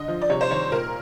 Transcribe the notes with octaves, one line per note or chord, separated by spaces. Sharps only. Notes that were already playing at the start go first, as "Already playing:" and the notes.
Already playing: D3 D#5
F3
D5
C3 C#5
C5
D#3 C#5
A#2 A#4